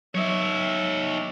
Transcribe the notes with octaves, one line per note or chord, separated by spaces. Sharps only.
F#3 D#4 C#5 E5